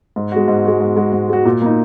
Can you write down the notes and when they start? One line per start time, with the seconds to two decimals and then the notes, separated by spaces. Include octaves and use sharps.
0.16 G#2
0.32 G#3 F#4
0.48 G#2
0.65 G#3 F#4
0.81 G#2
0.96 G#3 F#4
1.13 G#2
1.30 G#3 F#4
1.45 A#2
1.62 A#3 D#4